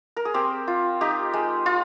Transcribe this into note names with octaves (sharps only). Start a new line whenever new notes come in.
A#4
G#4
C4 G4
F4
D#4 G4
G#3
F4